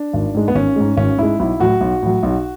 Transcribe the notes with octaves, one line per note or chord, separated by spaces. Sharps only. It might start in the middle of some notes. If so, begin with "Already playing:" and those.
Already playing: D4
G#1
G#2 G#3
B3
G#1 C#4
G#2 G#3
G#1 C#4
G#2 G#3 E4
B1 E4
A2 F#3 F#4
B1
A2 F#3
B1